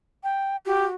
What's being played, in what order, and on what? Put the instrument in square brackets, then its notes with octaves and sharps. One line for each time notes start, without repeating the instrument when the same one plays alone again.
[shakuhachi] G5
[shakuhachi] F#4 [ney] G4